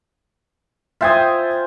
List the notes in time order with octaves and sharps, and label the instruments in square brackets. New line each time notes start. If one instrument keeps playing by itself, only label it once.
[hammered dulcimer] F4 C5 G#5 [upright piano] E5 G5 D#6